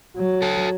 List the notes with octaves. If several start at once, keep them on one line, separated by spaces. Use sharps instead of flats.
F#3
F#4 A4